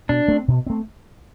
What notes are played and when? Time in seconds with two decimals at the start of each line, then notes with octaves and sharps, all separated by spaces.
0.09 B2 D4
0.28 A3 C4
0.48 B2
0.67 A3 C4